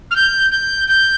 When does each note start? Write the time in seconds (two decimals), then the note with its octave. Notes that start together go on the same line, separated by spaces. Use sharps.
0.11 F6
0.15 G6
0.51 G6
0.88 G6